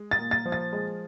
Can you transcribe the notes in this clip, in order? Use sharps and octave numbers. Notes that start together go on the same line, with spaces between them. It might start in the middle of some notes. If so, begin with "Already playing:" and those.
Already playing: G#3
A6
A#2
A6
F3
A6
G#3